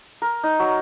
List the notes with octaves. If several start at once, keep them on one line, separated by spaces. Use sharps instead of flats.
A#4
D#4
F#3